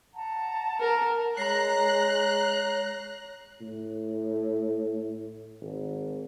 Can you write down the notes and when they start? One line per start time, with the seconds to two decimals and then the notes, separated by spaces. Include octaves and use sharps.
0.14 F#5 A5 A#5
0.80 A#4
1.37 G#3 C#5 A#5 F#6 A#6 C7
3.61 A2
5.61 G#1